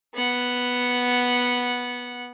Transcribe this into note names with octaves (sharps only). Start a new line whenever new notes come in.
B3 F#5